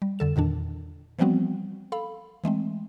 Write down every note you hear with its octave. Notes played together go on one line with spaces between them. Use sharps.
G3
F2 D3 A4 E7
E2 A#2 D#3 D4
E3 F3 G3 B3 C4 F#4
A4 F5 B5
E3 G#3 A3 C4